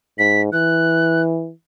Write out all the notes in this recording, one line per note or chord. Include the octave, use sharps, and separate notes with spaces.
G#2 B6
E3 F#6